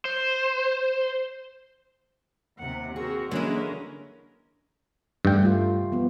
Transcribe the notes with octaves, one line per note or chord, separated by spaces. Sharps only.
C5
D#2 C3 F#5
C4 F#4 G#4 A#4
D3 E3 F#3 G#3 A#3 C#4 E4 A#4
G2 A3 G5
G3 A3 F4
F3 B3